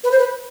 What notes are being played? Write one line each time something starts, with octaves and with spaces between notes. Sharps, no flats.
B4
C5
B4